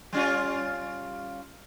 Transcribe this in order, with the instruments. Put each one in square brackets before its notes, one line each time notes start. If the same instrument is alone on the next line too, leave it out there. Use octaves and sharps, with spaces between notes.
[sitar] G3 C#4 F4